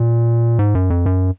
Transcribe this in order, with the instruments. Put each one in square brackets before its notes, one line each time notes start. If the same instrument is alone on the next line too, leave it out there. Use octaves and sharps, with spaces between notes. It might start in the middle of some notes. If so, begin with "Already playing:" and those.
Already playing: [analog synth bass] A#2
G#2
F#2
F2
F#2